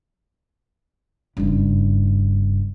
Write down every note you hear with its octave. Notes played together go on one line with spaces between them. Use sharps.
F#1 G2